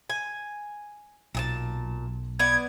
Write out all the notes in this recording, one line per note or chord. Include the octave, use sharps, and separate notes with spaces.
G#5
B1 A#2 G#4 A5
B3 D5 F#5 G#6